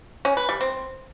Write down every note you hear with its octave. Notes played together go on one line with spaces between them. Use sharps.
C#4
B4
G3
C4